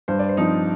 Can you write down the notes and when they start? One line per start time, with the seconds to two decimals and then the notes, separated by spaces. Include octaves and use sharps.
0.08 G2 C5
0.19 D5
0.29 C5
0.37 F3 C4 D#4